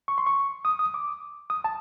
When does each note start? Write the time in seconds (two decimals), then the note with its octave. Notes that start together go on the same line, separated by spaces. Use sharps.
0.08 C#6
0.18 C6
0.27 C#6
0.65 D#6
0.79 D#6
0.94 D6
1.50 D#6
1.64 A5